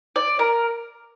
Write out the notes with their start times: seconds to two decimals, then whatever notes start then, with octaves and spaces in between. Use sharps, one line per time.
0.16 D5
0.39 A#4